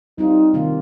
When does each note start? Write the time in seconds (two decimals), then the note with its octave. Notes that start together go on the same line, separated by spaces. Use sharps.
0.18 G3 C4 D#4 F4
0.54 C3 D#3 A#3 F4